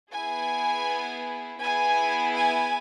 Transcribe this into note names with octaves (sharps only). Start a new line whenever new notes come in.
B3 E4 G#4 G#5
B3 E4 G#4 G#5
G#5